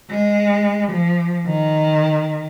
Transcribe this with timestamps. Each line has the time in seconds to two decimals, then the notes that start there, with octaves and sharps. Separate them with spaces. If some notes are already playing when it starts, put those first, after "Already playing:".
0.10 G#3
0.92 F3
1.47 D#3